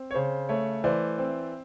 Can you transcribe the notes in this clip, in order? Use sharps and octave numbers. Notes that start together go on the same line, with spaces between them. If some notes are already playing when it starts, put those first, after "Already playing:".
Already playing: C4
C#5
C#3 C5
A3 C#5
E3 C5 D5
C4